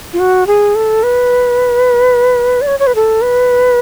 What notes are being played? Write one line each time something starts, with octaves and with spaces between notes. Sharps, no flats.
F4
F#4
G#4
A4
B4
D5
C#5
C#5
B4
A4
B4